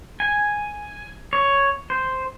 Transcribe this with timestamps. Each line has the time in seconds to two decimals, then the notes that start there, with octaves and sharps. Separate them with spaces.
0.20 G#5
1.33 C#5
1.90 C5